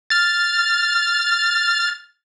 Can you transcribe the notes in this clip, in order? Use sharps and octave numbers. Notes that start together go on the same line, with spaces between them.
F6 A6